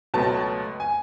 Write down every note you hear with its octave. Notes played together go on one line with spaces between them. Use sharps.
C#2 B2 F#3 A3 A5
G#5